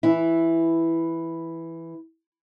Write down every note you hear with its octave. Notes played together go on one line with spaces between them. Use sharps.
E3 E4